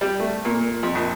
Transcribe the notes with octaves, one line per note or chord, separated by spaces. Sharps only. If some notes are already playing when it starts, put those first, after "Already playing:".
G3
A3
A#2
F2
A#1